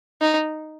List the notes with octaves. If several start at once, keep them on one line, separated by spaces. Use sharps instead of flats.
D#4